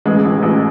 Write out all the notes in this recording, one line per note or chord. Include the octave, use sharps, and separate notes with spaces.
A1 G#3
A1
A1